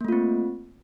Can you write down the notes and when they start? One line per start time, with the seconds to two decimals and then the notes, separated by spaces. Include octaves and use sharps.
0.01 A#3
0.05 A3
0.08 F4
0.12 C4